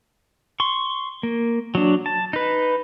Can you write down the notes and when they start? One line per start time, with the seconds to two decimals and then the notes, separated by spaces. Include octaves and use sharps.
0.60 C6 C#6
1.23 A#3
1.75 F#3 D4
2.06 A5
2.33 D#4 B4